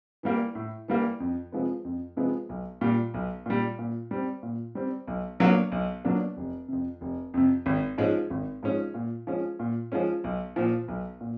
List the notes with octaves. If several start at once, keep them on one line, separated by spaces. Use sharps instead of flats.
E3 G3 A#3
A2
E3 G3 A#3
F2
C3 F3 G#3 B3
F2
C3 F3 G#3 B3
B1
A#2 G3
B1
A#2 G3
A#2
G3 C4
A#2
G3 C4
B1
B2 F#3 A#3 D4
B1
B2 F#3 A#3 D4
F1
F2 C3
F1
F2 C3
G#1
G#2 F3 G#3 C#4
G#1
G#2 F3 G#3 C#4
A#2
F3 G#3 C#4
A#2
F3 G#3 C#4
B1
A#2 F3
B1
A#2